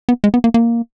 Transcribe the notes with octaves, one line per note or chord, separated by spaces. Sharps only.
B3
G#3
B3
A#3
A#3